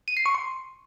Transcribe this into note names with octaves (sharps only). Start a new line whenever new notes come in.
D#7
C7
C#6
C6